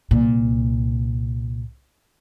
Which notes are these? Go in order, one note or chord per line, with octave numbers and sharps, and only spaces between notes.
C2 A#2